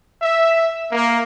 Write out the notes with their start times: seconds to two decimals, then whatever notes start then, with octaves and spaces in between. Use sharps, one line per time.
0.22 E5
0.92 A#3